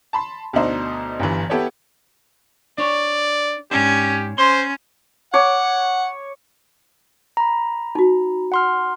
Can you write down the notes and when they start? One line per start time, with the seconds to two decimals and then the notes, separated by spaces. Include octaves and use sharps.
0.13 A5 B5 C6
0.53 D2 B2 D4 D#4 C5
1.19 G1 G2 E3
1.50 B3 E4 G4 A4 B4 C#5
2.78 D4 C#5 D5
3.71 G#2 C#4 D4 G4
4.38 C#4 C5 C6
5.34 C#5 F#5 D6
7.37 A#5 B5
7.95 D#4 F#4
8.52 F#5 C6 F6